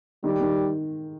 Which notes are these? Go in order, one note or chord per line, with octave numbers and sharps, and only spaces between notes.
D#3 G3
D#3